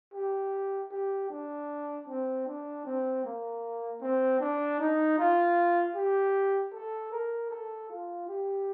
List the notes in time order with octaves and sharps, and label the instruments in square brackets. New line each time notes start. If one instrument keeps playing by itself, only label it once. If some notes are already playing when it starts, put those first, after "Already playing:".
[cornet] G4
G4
D4
C4
D4
C4
A#3
C4
D4
D#4
F4
G4
A4
A#4
A4
F4
G4